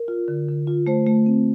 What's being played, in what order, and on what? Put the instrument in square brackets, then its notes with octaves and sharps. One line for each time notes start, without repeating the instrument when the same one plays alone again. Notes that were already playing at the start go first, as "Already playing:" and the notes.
Already playing: [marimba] A#4
F4
D3
D3
F4
A3 C5
A3
C4